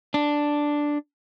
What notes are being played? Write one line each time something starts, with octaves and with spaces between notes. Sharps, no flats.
D4